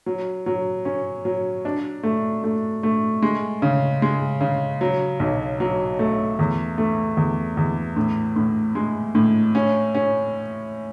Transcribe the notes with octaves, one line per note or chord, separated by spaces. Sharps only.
F#3
F#3
C#4
F#3
D4
A3
A3
A3
G#3
C#3
G#3
C#3
F#3
B1
F#3
A3
E2
A3
E2
E2
A2
A2
G#3
A2
C#4
C#4